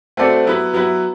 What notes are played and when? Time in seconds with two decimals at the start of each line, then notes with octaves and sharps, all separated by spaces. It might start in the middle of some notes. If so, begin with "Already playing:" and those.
0.17 A3 C4 F#4 A4 D5
0.45 F#3 B3 E4 B4
0.73 F#3 B3 E4 B4